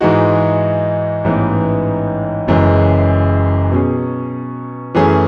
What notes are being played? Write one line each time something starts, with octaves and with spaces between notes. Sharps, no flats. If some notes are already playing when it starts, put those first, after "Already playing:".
G#2 E3 G#3 D#4 F#4
A1 G#2 E3 B3 D#4
F#1 F#2 E3 G#3
B2 F#3 C#4 G#4
F#2 E3 A3 C#4 G#4